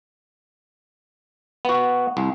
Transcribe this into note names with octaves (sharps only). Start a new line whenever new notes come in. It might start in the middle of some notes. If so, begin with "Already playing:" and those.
B3 F#4
C2